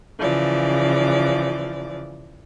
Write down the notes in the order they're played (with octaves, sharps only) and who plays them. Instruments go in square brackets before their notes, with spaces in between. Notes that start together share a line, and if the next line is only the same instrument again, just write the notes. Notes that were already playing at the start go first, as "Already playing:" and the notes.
[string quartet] C#3 E3 F3 D5